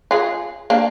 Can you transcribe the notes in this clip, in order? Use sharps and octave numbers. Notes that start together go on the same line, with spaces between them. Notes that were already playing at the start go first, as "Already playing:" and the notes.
F4 G#4
A#3 D4